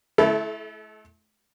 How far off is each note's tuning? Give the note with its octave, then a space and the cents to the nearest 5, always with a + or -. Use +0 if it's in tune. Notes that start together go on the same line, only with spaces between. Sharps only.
A3 -40 E4 +0 A4 -15